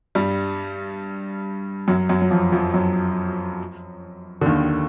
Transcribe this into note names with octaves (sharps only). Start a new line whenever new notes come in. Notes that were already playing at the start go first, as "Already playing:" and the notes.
G2 G3
F#2 F#3
F#2 F#3
F#3
F2 F3
F2 F3
F#2 F#3
D3
D#2 D#3